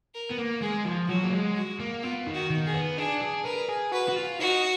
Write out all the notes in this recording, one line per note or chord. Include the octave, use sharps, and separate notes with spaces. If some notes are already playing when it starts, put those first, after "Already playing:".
A#4
B3
A#3
G#3 G#4
F3
F#3 F#4
A#3
G#3
F#4
A#3
B3 F4
D#3
F#4
D#3
G#4
B3
D4 G#4
G#4
A#4 B4
G#4
F#4 B4
F#4
F4
D#4 F#4